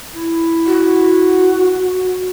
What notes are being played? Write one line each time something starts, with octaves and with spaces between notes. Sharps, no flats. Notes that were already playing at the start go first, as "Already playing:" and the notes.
E4
F#4